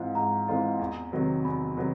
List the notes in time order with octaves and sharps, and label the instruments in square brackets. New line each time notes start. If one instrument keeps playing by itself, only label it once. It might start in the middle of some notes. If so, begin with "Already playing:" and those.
Already playing: [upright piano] G#2 E3 G#3 C4 F4
[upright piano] G#2 [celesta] A#5
[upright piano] E3 G#3 C4 F4
E2
C3 D#3 F#3 B3
[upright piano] E2 [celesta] B5
[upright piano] C3 D#3 F#3 B3